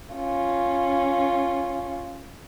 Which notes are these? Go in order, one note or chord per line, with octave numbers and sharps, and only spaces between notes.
C#4 F4